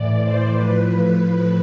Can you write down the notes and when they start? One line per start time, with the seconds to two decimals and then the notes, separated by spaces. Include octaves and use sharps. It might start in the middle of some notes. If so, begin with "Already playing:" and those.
Already playing: A2 E3 D5
0.21 C5
0.52 A2 F3 B4